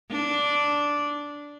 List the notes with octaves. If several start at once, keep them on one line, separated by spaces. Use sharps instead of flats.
D4